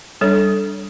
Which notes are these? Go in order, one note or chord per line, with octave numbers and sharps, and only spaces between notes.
G3 D4 A4 C#5